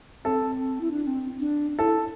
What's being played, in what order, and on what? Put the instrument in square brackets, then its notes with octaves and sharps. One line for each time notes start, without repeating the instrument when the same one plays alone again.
[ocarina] C4 [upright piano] A4
[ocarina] E4
D4
D4
C4
D4
[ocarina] E4 [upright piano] A4